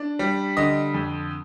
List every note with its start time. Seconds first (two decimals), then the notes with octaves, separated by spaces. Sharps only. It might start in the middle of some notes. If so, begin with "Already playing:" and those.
Already playing: D4
0.19 G3
0.57 D3 D#5 D#6
0.94 F2